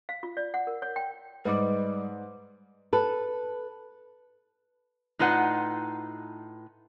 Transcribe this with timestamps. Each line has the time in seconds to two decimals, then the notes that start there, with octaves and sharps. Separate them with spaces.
0.09 F5
0.23 F4
0.37 D5
0.54 F#5
0.67 A#4
0.82 C#5
0.96 G5
1.45 G#2 G3 B4 D#5 D6
2.93 A4 B4
5.19 A2 D#4 F4 B4 F#5